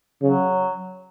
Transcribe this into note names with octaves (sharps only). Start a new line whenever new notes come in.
C#3 F#3